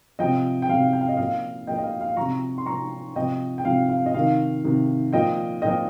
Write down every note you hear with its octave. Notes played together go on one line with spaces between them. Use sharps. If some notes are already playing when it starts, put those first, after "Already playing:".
C3 F3 D#5 G5
G5
C3 F3 F5
G5
F5
D#5
A#2 F3 F5
A#2 F3 D#5 G5
D#5
F5
F5
C3 F3 A#5 C#6
C6
C3 F3 A#5 C#6
C3 F3 D#5 G5
G5
C3 F3 F5
F5
D#5
C3 D#3 F5
C3 D#3
A#2 F3 D#5 G5
A#2 F3 D#5 G5